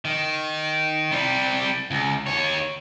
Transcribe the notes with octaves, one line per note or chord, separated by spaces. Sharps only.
D#3
C3 G3
C#2
D#2 C#5